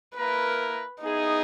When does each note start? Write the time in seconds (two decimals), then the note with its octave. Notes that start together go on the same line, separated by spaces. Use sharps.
0.16 A#3 E4 A#4 B4
1.02 B3 D#4 E4 G#4